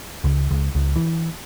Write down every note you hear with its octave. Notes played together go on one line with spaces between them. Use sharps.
C#2
C#2
C#2
E3